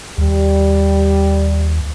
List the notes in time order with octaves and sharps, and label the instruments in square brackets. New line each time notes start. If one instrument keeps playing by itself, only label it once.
[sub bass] D#2 [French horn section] G3